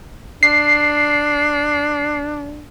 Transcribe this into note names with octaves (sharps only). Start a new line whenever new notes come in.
D4 C7